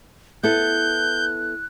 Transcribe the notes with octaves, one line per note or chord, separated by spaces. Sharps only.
B3 E4 A4 F#6 G6